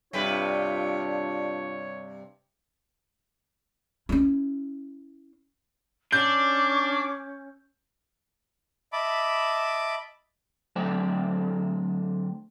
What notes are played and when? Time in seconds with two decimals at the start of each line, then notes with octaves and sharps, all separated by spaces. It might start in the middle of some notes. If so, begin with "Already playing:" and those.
0.13 G2 C3 D4 F4 B4 C#5
4.09 C#4 E4
6.12 C#4 D4 C#6 D6 G6
8.93 D#5 E5 A5 B5 D6
10.76 D3 F#3 A3 C4 C5 D5